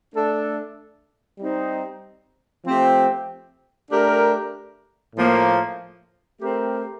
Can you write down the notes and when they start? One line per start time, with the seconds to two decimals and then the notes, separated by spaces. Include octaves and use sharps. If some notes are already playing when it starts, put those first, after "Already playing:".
0.14 A3 D4 A4
1.39 G3 C4 D#4
2.64 F3 A3 C4 G4
3.90 A3 D4 G4 A#4
5.16 A2 F3 A#3
6.41 A3 C4 G4 A#4